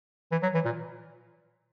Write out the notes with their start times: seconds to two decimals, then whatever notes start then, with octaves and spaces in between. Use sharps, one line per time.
0.31 E3
0.42 F#3
0.54 E3
0.65 A#2